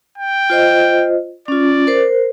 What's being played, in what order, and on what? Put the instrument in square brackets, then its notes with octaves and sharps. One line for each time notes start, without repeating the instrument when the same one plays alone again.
[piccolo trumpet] G5
[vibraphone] F4 C5 D#5
[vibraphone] C#4 F4 [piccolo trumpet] D5
[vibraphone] A#4 C5